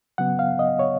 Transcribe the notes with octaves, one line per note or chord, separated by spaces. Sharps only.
C#3 F#3 B3 F#5
F5
D#5
C#5